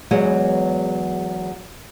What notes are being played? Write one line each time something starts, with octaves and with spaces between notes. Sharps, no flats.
E2 F#3 G#3 B3 C#5 F#5